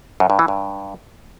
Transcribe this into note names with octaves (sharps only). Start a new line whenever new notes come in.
F#2
G2
E3
G2